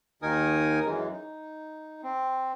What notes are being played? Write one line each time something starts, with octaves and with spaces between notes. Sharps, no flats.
D#2 D#3 D#4 A#4 G#5 D#6
F#2 E3 G#3
D#4
C4